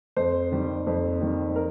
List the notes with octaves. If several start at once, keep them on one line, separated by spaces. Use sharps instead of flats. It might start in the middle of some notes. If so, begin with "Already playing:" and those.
F2 C5
D#3 G3
F2
D#3 G3
A#4